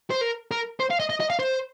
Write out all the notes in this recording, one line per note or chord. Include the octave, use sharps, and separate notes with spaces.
C5
A#4
A#4
C5
F5
D#5
D#5
D#5
F5
C5